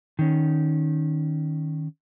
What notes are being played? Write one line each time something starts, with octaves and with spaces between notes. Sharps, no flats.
D#3 C#4